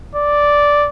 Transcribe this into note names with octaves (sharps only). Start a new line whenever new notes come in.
D5